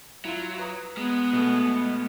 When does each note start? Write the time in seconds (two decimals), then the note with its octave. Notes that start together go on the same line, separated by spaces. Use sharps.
0.25 F#3 E4 F4
0.59 B4 A#5 D#6
0.97 G#3 B3
1.33 B2 A3